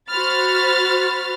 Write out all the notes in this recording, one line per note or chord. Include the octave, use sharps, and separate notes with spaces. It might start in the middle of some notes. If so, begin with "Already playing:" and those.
F#4 C5 B5 F6 A6